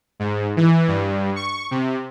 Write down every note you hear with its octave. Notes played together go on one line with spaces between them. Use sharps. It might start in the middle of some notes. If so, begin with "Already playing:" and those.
G#2
E3
G2
C#6
C3